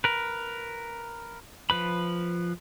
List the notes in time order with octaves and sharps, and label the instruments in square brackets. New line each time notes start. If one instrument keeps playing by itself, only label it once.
[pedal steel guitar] A#4 B4
F3 B4 B5